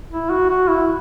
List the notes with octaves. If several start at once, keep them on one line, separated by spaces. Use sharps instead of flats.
E4
F#4
F#4
E4